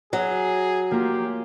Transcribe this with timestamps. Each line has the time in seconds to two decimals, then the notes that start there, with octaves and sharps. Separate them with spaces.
0.13 F#3 G#4
0.91 A#3 F4 G4